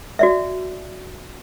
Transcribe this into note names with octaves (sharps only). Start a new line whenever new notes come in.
F#4 D5 E5